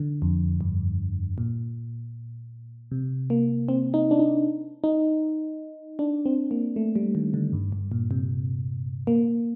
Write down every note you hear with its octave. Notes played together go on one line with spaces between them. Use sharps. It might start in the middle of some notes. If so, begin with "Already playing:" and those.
Already playing: D3
F2
G2
A#2
C3
A#3
C4
D#4
D4
D#4
D#4
D4
C4
A#3
A3
G3
D#3
D3
G2
G2
A#2
C3
A#3